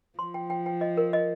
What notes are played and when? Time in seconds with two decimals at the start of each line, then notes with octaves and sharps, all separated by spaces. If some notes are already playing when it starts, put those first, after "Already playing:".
0.19 F3 C6
0.34 G5
0.50 G5
0.66 G5
0.81 D#5
0.97 A#4
1.13 D#5